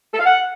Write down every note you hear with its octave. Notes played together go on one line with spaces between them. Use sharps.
A4
F5
F#5